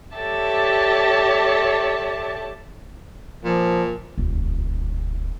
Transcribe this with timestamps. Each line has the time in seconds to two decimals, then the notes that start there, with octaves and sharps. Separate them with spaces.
0.17 G4 A4 C#5 D5 E5 A5
3.44 A#2 F3
4.18 D#1 C#2